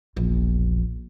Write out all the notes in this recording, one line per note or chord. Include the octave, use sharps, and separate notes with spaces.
E1 A#1